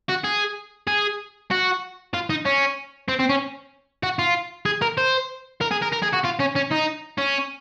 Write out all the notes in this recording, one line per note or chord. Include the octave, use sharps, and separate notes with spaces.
F#4
G#4
G#4
F#4
F4
D#4
C#4
C4
C4
C#4
F#4
F4
G#4
A#4
C5
A#4
G#4
A#4
A#4
G#4
F#4
F4
C#4
C#4
D#4
C#4